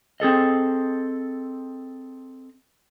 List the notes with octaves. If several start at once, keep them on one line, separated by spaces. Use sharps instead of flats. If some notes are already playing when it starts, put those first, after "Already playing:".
C4 G#4 A4 D#5